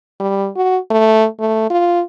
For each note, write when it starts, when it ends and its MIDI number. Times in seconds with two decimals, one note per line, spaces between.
0.20 0.48 55
0.56 0.77 66
0.90 1.26 57
1.39 1.69 57
1.70 2.01 65